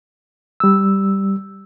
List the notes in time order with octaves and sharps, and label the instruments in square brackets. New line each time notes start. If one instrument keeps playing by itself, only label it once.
[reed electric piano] G3 E6